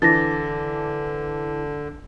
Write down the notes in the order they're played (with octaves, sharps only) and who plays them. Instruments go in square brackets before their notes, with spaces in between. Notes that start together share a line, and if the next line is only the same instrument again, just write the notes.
[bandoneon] D3 [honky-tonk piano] E3 [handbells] D4 A5 D6 [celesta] A6 A#6